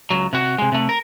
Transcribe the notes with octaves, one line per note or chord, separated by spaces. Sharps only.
C#2 F#3
C3 F#4
C3 G#3
C3 A3
A#4